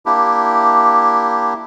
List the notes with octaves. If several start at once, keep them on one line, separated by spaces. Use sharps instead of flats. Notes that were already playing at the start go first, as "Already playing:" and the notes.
A#3 D4 E4 G4